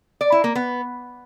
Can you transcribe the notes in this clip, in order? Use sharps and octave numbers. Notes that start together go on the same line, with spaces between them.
D5
E4
A#3
B3